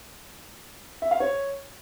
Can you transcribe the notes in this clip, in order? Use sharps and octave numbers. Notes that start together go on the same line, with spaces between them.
E5
F5
C#5